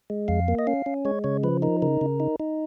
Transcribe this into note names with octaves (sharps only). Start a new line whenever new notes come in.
G#3
F2 F5
A#3
D#5
C#4 F5
C#4
G#3 C#5
C#3 C#5
F3 B4
D#4 A#4
C#3 A#4
C#3
D#4
D#4